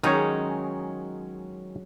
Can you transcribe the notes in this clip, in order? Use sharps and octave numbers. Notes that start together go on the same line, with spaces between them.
D#3 F#3 G#3 C#4 D#4 C#5